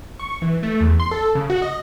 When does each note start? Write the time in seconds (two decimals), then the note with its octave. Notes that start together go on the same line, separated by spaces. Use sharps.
0.19 C#6
0.42 E3
0.63 A3
0.80 E2
1.00 C6
1.11 A4
1.35 C#3
1.50 F#4
1.62 D#5